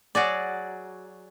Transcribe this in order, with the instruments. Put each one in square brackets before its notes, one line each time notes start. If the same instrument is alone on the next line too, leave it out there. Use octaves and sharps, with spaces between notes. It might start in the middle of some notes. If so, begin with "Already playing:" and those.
[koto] F#3 F#4 G#4 D5